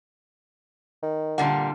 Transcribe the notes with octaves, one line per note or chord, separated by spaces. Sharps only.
D#3
A#2 D3 G3 F#5